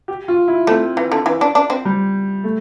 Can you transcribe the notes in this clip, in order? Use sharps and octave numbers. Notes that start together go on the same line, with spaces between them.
G4
F4
E4
A3 C4
E3
D3
E3
D4
D4
C4
G3
A3